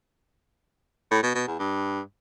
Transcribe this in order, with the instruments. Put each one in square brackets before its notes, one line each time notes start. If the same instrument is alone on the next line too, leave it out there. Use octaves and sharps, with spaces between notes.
[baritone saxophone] A2
B2
B2
E2
G2